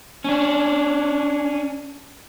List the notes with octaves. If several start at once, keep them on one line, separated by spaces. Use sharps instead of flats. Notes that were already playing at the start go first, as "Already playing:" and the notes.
C#4 D4